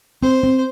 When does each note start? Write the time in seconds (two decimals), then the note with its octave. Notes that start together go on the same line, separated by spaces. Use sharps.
0.23 C4 C5
0.43 C4